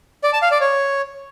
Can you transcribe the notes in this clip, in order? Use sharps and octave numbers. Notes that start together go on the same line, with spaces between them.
D5
A5
F5
D5
C#5